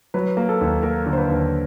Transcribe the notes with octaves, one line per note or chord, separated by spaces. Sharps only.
F#3 B4
A#3
A4
D#2
A#3 A#4
D3
C5
B4
D#2